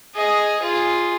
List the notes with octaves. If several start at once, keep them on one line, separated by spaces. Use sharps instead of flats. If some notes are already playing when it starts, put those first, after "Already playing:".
G#4 D#5
F4 G#4